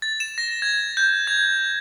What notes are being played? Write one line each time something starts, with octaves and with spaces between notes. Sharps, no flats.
A6
E7
A#6
G#6
G6
G#6